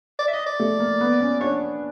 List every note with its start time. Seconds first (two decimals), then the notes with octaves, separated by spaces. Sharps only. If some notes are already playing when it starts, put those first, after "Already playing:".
0.19 D5
0.28 E5
0.33 D#5
0.46 D5
0.60 A3
0.80 A#3
1.01 B3
1.20 C#4
1.40 D4 C#5